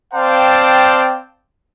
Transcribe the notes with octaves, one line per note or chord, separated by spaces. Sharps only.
C4 C5 D5 F5 G5 A5